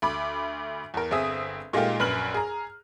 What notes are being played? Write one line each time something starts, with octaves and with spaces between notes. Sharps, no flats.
D2 B5 D6
E2 A#4
G1 C4 G#4 E5 D#6
A#2 G#3 A3 D#4 F4 G4
A#1 F#2 B4 F6 F#7
G#4 A#5